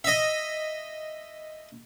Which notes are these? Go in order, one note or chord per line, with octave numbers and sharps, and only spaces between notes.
D#5 E5